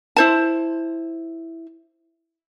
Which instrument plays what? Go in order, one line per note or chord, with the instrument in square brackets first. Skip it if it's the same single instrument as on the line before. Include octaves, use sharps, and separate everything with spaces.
[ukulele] E4 C5 A5